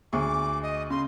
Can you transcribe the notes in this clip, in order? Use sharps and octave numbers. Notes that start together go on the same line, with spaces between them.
D2 G#4 C#6 D6
D#5
C#3 C6